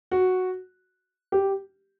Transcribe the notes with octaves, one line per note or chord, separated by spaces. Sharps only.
F#4
G4